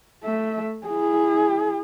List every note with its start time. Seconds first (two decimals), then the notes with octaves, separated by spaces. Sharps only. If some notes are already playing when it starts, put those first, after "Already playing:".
0.23 A3 E5
0.87 E4 G#4